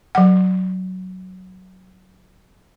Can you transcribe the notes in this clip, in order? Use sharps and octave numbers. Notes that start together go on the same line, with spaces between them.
F#3 F#5